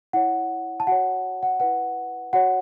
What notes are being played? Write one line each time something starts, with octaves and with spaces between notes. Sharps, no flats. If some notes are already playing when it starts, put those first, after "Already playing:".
E4 C#5 F#5
A5
F#4 C#5 F#5
F#5
E4 B4 F#5
F#4 C#5 F#5